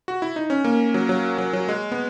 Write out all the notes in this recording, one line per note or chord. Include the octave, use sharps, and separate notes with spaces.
F#4
E4
D#4
C#4
A#3
F#3
F#3
F#3
F#3
G#3
B3